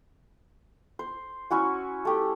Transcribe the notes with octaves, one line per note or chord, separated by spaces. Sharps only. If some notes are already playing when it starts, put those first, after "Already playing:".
C5
C#4 E4 F#4 G#5
A3 G4